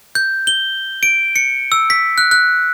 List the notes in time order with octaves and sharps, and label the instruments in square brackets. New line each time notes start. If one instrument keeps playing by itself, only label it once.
[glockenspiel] G6
G7
D7
C#7
E6
B6
F#6
F#6